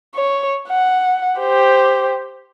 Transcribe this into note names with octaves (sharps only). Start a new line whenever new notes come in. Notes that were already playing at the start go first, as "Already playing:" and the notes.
C#5
F#5
G4 C5